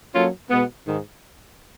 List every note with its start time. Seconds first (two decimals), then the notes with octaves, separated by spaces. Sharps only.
0.14 F#3 A#3 C#4 F4 A4
0.49 B2 G#3 B3
0.84 G#2 D#3 G#3